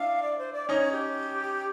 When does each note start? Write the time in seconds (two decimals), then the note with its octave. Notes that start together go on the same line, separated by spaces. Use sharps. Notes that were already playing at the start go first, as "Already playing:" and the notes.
Already playing: D4 E4 F5
0.22 D5
0.38 C5
0.53 D5
0.68 C#4 D#4 C#5
0.92 G4